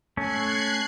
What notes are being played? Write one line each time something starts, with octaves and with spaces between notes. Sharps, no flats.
A3 C#4 F#6 G#6 C7